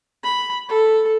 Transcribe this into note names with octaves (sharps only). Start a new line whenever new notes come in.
B5
A4